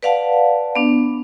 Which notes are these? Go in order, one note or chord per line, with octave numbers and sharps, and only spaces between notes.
B4 D5 F5 F#5 A5
B3 D4